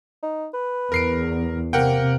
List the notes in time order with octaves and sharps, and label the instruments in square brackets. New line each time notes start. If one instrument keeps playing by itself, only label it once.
[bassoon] D#4
B4
[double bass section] E2 [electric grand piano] A#4 C7 D7
[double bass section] C3 [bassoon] A#3 [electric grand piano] A#4 F#5 G5